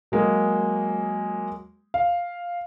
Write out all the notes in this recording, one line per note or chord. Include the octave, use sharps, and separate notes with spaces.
F#3 G#3 A#3
F5